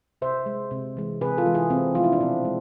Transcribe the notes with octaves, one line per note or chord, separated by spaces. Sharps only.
C3 C5 E5
G#3
C3
E3 G#3
C3 G#4 B4
F4 A4
E3 G#3
E4 G#4
C3 C4
F3 A3 F4
E4
D4
B2 C4
G#3